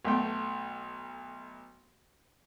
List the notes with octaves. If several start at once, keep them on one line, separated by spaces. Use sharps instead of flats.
B1 A3 G5